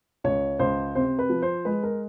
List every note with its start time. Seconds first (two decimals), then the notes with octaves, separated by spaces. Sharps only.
0.24 C#2 C#5
0.59 C#2 C5
0.95 C3 C5
1.19 B4
1.30 F3
1.42 C5
1.65 G#3 B4
1.83 A#4